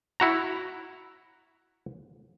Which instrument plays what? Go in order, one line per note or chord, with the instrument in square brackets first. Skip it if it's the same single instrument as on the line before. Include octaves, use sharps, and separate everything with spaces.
[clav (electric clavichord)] E4 F#4 A#5